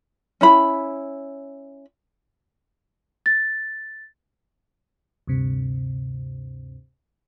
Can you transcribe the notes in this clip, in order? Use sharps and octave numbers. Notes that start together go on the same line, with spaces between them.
C#4 E4 B5
A6
D2 G2 C3